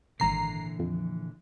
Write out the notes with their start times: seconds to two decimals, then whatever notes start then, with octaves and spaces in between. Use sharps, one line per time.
0.20 G#1 A#2 D3 E3 A#5 C7
0.79 F2